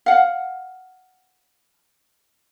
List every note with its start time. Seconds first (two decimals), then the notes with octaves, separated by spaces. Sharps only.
0.06 F5 F#5